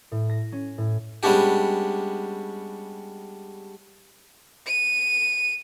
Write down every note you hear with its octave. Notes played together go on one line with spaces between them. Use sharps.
A2
A#6
C#4
A2
G3 G#3 B3 C#4 D4 G4
D#7